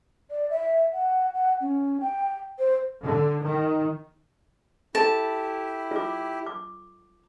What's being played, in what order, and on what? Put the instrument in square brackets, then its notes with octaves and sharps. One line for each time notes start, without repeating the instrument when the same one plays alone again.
[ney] D5
E5
F#5
F#5
C#4
G5
C5
[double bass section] D3
D#3
[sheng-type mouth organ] E4 G4 [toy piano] A4 [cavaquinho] A5
[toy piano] F4 D6
D6